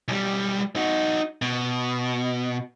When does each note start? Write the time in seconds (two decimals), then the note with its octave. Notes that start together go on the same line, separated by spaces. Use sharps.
0.08 B1 G3
0.76 D#4 F#4
1.42 B2